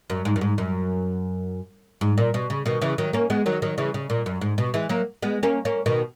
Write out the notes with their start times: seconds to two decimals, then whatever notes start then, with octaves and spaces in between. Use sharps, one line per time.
0.10 F#2
0.25 G#2
0.36 F#2
0.41 G#2
0.58 F#2
2.01 G#2
2.18 A#2
2.34 B2
2.50 C#3
2.66 B2 D#3
2.82 C#3 E3
2.98 D#3 F#3
3.13 A#3 C#4
3.30 G#3 B3
3.46 D#3 F#3
3.62 D#3 F#3
3.78 C#3 E3
3.94 C#3
4.10 A#2
4.26 F#2
4.41 G#2
4.58 B2
4.74 E3 G#3
4.89 F#3 A#3
5.22 G#3 B3
5.43 A#3 C#4
5.65 A#3 C#4
5.86 B2 D#3